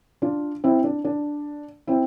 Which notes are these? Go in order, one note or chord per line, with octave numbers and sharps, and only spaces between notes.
D4 F4
C4 E4
D4
D4
C4 E4